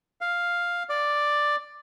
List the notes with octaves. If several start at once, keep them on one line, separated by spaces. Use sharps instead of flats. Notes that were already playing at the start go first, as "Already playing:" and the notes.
F5
D5